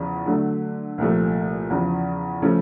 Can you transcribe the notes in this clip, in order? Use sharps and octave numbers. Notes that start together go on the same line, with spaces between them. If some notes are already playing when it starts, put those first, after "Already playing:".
Already playing: E2 C#3 F3
D3 F#3 A3
C2 A#2 F3 A3
E2 C#3 F3
C#3 F3 A3 C#4